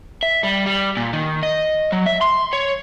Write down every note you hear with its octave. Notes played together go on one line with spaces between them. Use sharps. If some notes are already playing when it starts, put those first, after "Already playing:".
E5
G3
G3
A#2
D#3
D#5
F#3
E5
C6
C#5